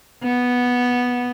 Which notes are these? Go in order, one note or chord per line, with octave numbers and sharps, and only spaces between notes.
B3